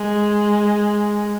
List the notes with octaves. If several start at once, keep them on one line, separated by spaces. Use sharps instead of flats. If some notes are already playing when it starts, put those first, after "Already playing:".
Already playing: G#3